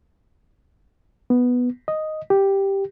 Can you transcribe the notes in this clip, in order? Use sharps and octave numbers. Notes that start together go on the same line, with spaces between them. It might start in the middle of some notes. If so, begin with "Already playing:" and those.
B3
D#5
G4